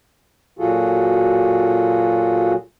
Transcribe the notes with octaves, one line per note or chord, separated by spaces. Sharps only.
A#2 F#3 F4 F#4 G#4 A4